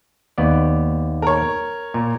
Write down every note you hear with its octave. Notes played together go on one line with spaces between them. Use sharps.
D#2 B3 D5
A#4 C#5
A#2